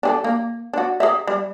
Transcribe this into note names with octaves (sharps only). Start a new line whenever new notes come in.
D4 G#4 A4
A#3
D4 F#4
G#4 A#4 E5
G3